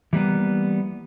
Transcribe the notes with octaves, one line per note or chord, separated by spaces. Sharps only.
E3 G3 A#3 B3